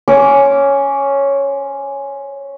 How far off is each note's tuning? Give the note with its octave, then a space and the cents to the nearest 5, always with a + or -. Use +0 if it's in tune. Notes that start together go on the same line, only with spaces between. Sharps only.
C#4 +0 C5 +25 D6 -20